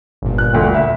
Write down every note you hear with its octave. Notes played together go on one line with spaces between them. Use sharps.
G1 A#2
F#6
D#1 D2
E5